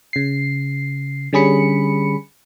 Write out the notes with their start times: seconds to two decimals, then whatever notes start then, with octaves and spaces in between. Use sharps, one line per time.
0.13 C#3 C7
1.33 D3 G3 C#4 G#4 B5 C#7